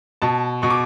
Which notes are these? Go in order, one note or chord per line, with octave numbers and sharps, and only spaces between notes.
B2 A5
B2 C#6
D6